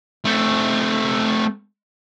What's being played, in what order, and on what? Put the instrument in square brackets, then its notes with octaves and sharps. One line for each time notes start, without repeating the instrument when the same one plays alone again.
[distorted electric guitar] A3 C4